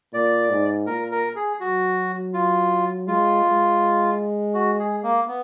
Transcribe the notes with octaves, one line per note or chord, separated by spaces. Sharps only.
A#2 D5
G#2
A#2 A#4
A#4
G#4
F#3 F#4
F4
G#3 F4
G#3
F#4
G#4
A#3
B3